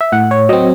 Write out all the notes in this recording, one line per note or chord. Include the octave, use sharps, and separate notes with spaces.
E5
A2 F#5
C#5
F#3 C4 D#5